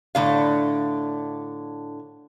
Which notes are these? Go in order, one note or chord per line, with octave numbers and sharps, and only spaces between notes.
A2 D3 F5